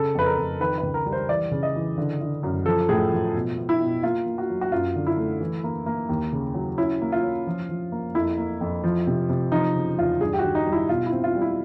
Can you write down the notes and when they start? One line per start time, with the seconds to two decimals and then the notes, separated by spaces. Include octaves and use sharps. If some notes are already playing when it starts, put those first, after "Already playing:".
Already playing: C#3 A4
0.15 F2 B4
0.26 A#4
0.37 F2
0.60 D#3 B4
0.78 C#2 B4
0.94 A#4
1.06 G3
1.12 C5
1.29 E3 D5
1.51 C#3
1.63 D#5
1.75 E3
1.98 D3
2.21 D3
2.43 F#2
2.66 F3 A4
2.89 A2 G#4
3.12 F3
3.35 B2
3.58 B3
3.69 E4
3.81 B2
4.03 A#3 F4
4.26 A#3
4.38 F#4
4.50 F#3
4.61 F#4
4.72 F#2 F4
4.96 D3
5.06 E4
5.17 A3
5.40 E3
5.64 A#3
5.86 A#3
6.09 D#2
6.33 C#3
6.54 F#3
6.78 C#4 E4
7.01 A#3
7.12 F4
7.23 C#4
7.47 F3
7.69 F3
7.92 A#3
8.14 F2 E4
8.38 A#3
8.61 F2
8.84 F3
9.07 C3
9.29 C3
9.52 F3 D#4
9.75 C#3
9.98 E2 F4
10.21 G2 G#4
10.33 G4
10.39 F#4
10.44 D#3
10.55 D#4
10.67 G3
10.72 E4
10.89 B2 F4
11.06 E4
11.12 C4
11.24 F4
11.35 G3
11.41 E4